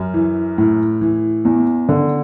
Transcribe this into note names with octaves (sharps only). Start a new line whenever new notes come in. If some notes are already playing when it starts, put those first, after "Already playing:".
Already playing: F#2
E3
A2
E3
E2
D3